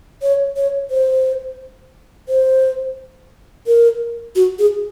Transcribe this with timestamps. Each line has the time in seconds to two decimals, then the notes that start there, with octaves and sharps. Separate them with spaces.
0.22 C#5
0.57 C#5
0.90 C5
2.29 C5
3.67 A#4
4.35 F#4
4.59 G#4